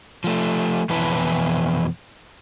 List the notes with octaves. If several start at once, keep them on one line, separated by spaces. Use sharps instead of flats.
F3 A3
F2 B2 E3 E4 B4 A5